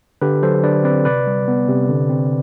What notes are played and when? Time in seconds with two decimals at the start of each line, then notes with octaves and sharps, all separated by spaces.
0.21 D3 G4 B4
0.42 F#3 A4 C5
0.63 D3 B4 D5
0.84 C4 B4 D5
1.05 C3 B4 D5
1.27 G3
1.48 B3
1.68 C3
1.89 D3
2.10 C4